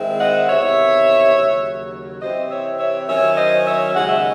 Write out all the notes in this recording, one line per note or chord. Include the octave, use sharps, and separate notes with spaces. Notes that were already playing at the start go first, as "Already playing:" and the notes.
Already playing: D#3 G#3 C4 E4
D#5 F#5
E2 C3 D#3 C#5 E5
D#2 C#3 F#3
C3 E3 C4 E4 C5 D#5
C#5 E5
C#5 E5
D#3 F#3 C#4 E4 C#5 E5
C5 D#5
C#5 E5
D#2 C#3 G#3 D#4 F#5
E5